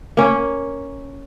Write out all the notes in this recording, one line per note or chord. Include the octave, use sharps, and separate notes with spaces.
A#3 C#4